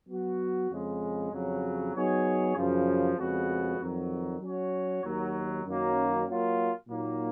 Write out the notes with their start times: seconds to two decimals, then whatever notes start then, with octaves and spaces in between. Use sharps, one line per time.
0.09 F#3 B3 F#4
0.71 F2 C#3 G#3
1.32 F2 C#3 F#3
1.95 F#3 B3 D#4 G#4 C#5
2.56 F#2 C#3 F3
3.18 F2 C#3 G#3 B3 F#4
3.80 F2 D#3 F#3
4.41 F#3 C#4 F#4 C#5
5.04 D#2 D#3 F#3
5.66 F#2 D#3 F#3 A#3 C#4
6.27 F#3 A#3 F4
6.89 A#2 F#3 A#3 D#4